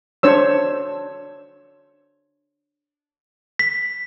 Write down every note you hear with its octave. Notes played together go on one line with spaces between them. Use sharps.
D4 C5 C#5 E6
B6